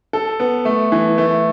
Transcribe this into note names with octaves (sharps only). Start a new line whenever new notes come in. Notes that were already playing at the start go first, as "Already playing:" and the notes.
A4
B3
A3
E3
A3